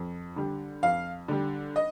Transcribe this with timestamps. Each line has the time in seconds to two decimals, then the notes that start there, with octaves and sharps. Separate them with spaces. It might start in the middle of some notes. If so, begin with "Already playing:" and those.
Already playing: F2
0.36 D3 G3
0.83 F2 F5
1.28 D3 G3
1.76 D#5